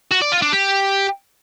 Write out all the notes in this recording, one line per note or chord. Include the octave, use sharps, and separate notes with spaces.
F#4
D5
F4
D4
G4